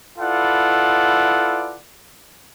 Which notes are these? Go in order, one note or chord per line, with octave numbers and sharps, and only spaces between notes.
E4 F4 A4 B4 D5 F#5